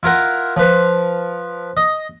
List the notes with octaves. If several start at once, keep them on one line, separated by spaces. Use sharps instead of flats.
E4 F4 A#4 F#5
F3 B4
D#5